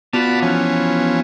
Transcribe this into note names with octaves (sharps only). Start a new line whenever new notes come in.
B3 F4 F#4 D5 A5 B5
E3 F3 C#4